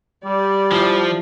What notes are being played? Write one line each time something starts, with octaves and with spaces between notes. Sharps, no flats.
G3 G4 D5
F3 E4 F4 A5